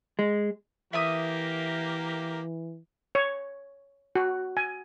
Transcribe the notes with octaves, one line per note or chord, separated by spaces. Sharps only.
G#3
E3 A#3 G4 A#4 E5 D6 D#6
C#5
F#4
G#5